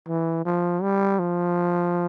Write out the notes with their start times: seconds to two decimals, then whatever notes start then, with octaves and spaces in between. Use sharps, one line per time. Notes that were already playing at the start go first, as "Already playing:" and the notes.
0.08 E3
0.45 F3
0.82 G3
1.19 F3